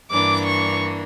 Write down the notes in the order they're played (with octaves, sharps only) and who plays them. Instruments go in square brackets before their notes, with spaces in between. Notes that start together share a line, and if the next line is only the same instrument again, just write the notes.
[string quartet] G2 E3 A#3 D4 [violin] D6
[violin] C#6